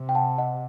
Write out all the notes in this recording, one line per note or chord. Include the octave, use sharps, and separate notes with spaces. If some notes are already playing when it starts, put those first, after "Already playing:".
Already playing: C3
G5
F#5 A5
D#5 F#5